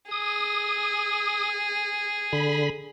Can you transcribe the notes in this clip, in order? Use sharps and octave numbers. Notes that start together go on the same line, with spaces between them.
G#4 D#6
D3 B5